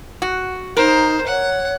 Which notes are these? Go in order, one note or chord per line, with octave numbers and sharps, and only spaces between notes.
F#4
D#4 A#4 C5
C#5 F#5